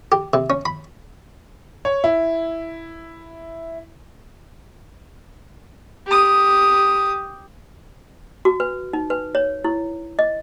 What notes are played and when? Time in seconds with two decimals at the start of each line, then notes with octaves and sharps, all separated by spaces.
0.12 G4
0.33 C3
0.50 C#4
0.65 B5
1.85 C#5
2.04 E4
6.07 G4 D#6
8.45 F#4
8.60 B4
8.93 D#4
9.10 B4
9.35 C#5
9.64 E4
10.19 D#5